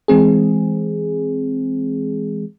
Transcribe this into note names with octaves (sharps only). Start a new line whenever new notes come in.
E3 G#3 C4 G#4